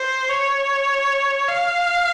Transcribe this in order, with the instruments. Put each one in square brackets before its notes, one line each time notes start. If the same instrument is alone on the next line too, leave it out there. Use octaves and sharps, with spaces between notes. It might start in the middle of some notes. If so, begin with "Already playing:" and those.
Already playing: [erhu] C5
C#5
F5